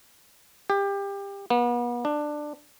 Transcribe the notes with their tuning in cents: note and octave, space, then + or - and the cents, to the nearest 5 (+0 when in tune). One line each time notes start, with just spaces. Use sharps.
G4 +25
B3 -40
D4 +15